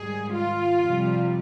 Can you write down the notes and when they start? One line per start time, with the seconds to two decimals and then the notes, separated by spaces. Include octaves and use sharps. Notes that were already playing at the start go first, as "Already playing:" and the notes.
Already playing: G#2 D#3 G3 G#4
0.32 F4
0.79 F2 C3 G3